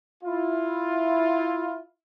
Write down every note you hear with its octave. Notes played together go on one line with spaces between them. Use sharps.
E4 F4